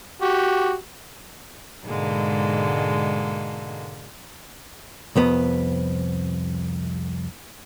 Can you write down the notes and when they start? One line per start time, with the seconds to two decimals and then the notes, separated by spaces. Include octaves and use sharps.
0.22 F#4 G4
1.85 G#2 B2 D3 G#3 A#3 A4
5.16 C2 F2 B3